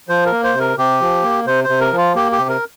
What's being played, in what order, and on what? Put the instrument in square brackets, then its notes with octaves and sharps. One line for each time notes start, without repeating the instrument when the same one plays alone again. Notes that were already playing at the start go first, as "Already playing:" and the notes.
[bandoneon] F3 C5
A#4
A#3
C5
C3
A#4
C3 G4
F3
A#3
C3 C5
C5
C3
A#4
F3
F4
A#3 G4
G4
C3
A#4